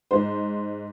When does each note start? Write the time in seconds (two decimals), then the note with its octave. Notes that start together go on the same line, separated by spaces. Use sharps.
0.11 G#2 C5